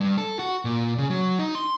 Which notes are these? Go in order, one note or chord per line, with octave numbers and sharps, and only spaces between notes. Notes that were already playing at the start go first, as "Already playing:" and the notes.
G2
A4
F#4
A#2
C#3
F#3
D#4
C6